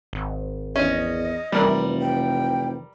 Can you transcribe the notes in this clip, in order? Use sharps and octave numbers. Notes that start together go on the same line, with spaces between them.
G#1
E2 C#4 D#5
F1 E3 G3 A#4
G5